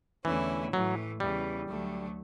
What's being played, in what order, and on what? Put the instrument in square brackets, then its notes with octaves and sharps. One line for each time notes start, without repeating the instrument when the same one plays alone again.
[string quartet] E2 D3 A3 C#4 E4 [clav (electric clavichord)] E3
[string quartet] A2 E3 A3 [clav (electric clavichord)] F#3
[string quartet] E2 C#3 E3 [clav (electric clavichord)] G3
[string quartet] D2 D3 F#3 A3